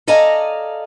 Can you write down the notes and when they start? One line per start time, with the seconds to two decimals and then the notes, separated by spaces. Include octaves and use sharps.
0.07 A4 D5 D#5 F5 G#5 A#5